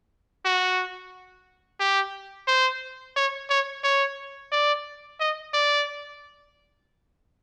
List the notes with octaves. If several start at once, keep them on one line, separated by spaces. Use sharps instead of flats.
F#4
G4
C5
C#5
C#5
C#5
D5
D#5
D5